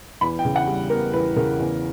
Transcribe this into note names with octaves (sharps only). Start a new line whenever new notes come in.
E2 B5
G5
C#3
F#5
G3
B3 A#4
E2 B4
C#3 A#4
E2